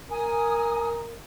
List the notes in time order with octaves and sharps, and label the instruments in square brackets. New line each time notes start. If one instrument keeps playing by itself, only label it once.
[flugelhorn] A#4 [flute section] G#5 D#6